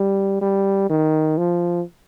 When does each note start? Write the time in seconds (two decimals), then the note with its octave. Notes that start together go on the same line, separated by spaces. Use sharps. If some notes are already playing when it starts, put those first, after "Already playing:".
Already playing: G3
0.41 G3
0.90 D#3
1.38 F3